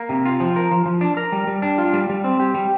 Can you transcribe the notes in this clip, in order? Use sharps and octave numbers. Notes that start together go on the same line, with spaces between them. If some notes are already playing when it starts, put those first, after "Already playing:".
Already playing: A#3
C3
F4
F3
A#4
F3
F3
D4
A#4
G3
G3
D4
F4
G3
G3
C4
G4
G3